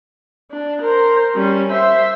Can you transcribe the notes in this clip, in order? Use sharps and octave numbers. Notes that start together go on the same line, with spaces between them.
D4
A#4 C5
G3 C#4
C5 E5